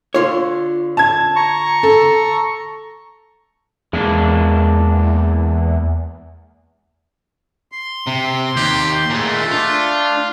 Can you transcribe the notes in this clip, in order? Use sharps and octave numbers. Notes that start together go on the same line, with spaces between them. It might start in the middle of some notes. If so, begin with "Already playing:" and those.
D3 F4 C#5
A5 G#6
A#5 C#6
A4
E2 G#3 A#3 D4
C6
C3
D#2 G4
A#2 G#3 A3
D4 F4